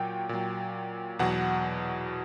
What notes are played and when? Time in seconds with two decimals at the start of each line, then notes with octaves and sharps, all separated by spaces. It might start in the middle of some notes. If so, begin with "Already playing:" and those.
Already playing: A#2 F#3 G5
0.29 A#2 F#3
1.19 E2 B2 F#3 F#5